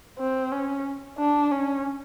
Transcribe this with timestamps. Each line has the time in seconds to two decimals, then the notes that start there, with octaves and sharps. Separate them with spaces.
0.18 C4
0.51 C#4
1.18 D4
1.51 C#4